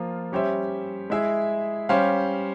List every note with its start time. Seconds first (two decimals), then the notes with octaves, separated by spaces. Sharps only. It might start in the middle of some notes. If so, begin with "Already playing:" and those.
Already playing: F3 A#3 F4
0.32 G3 C#4 G4 C5 E5
1.10 G#3 E4 G#4 E5
1.89 G3 C#4 G4 C5 F5